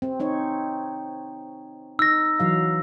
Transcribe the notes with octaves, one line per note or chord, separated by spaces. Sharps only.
C4
C4 D#4 C#5
D#4 E6 A#6
E3 F#3 F5